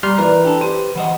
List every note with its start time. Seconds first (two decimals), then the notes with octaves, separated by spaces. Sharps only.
0.03 G3 A#5 C6 F6
0.18 E3 A#4 B4 D5
0.45 D4 G4 A4
0.61 G4 C5 D#7
0.95 E3 C5 D#5 F#5